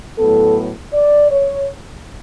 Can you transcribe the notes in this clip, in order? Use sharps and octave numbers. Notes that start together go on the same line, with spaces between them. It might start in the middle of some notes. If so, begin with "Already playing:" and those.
A2 F#3 B3 A4
D5
C#5